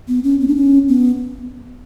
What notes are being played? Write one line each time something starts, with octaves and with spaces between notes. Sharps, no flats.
B3
C#4
B3
D4
C#4
B3